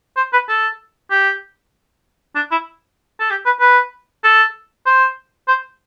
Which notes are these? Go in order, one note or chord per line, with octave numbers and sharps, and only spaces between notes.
C5
B4
A4
G4
D4
E4
A4
G4
B4
B4
A4
C5
C5